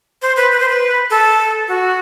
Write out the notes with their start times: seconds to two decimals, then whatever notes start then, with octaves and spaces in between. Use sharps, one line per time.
0.22 C5
0.37 B4
0.52 B4
0.60 C5
0.69 B4
1.10 A4
1.68 F#4